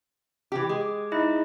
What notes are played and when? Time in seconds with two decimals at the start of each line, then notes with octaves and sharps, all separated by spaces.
0.52 E3 G4
0.69 G#3
0.81 D6
1.12 D#4 E4 D#5